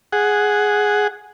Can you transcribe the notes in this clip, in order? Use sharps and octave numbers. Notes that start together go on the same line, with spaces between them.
G#4 F#5